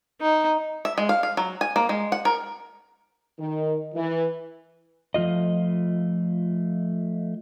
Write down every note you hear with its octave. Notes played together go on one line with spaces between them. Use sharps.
D#4
E5
G#3
F5
F5
F#3
G#5
A#3
G#3
F#5
A#4
D#3
E3
F3 A3 F4 D#5